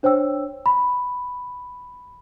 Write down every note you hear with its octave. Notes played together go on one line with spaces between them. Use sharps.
D4 C5 C#5 G5 E6
B5